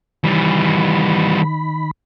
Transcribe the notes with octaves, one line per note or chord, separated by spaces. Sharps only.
D#3 E3 G3 B5